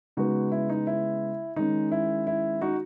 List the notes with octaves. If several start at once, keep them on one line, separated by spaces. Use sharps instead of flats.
C#3 G#3 B3 D#4 F#4
E4
D#4
E4
D#3 G#3 C#4 D#4
E4
E4
D#4 F#4